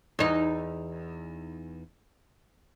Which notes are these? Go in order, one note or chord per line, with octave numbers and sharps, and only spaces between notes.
E2 D#4